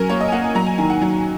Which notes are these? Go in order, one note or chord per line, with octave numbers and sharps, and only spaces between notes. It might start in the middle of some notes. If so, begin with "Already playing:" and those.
Already playing: F#3 C#4 A#4 G#5
A#3 C#5
D#5
G#5
A#3 F#5
G#5
F#3 A#5
G#5
D#3 G#5
F#5
F#3